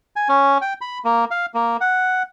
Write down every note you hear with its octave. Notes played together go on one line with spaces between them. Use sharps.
G#5
C#4
G5
B5
A#3
F5
A#3
F#5